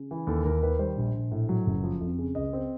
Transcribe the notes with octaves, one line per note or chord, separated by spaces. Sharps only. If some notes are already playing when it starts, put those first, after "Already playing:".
Already playing: C#3
E3
D#2 A4
D#2 A#4
D#3 B4
G3 C5
A#1
A#1
A2
F#3
F#1
F3
F2
C#3
C#2 D#5
C4